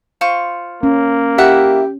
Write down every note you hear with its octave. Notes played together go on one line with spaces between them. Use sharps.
F4 C5 C#6
A#3 C#4
E4 G4 E5 F#5